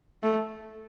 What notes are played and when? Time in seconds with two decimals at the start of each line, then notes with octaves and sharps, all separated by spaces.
0.23 A3